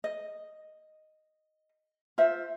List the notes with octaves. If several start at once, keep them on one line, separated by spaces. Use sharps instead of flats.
D#5
F4 C5 E5